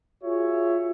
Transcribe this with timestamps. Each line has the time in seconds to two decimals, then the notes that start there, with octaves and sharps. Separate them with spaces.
0.23 F4 F#4 G#4 C#5 E5